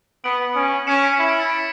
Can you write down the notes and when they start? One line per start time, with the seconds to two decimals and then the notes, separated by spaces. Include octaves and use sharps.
0.24 B3 D7 F#7
0.55 C#4
0.87 C#4 C#7 E7
1.03 B6 D7
1.19 E4
1.29 B6 D7
1.39 A6 C#7
1.50 B6 D7